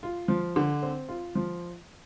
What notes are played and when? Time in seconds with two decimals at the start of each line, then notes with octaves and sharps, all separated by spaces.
0.03 F4
0.28 F3
0.56 D3
0.83 C4
1.09 F4
1.35 F3